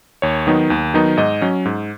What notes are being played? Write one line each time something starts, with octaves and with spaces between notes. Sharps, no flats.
D#2 C#5
D#3 F#3 B3 D#4
D#2
D#3 F#3 B3 D#4
G#2 D#5
F#3 C#4
G#2